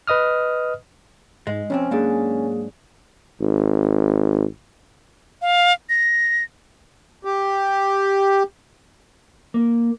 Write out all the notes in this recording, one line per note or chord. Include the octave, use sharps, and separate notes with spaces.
B4 D#5 D#6 F6
G#2 G#3
F2 C3 C4 C#4
G#2 F#3 A#3 D4 G#4
G#1
F5
A#6
G4
A#3